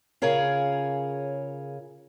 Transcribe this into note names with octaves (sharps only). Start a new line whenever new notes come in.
C#3 F4 G#4 A#4 C#5 F5